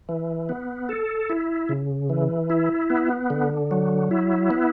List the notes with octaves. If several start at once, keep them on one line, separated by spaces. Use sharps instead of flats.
E3
B3
A4
E4
C#3
E3
E4
B3
D3
F#3
E4
B3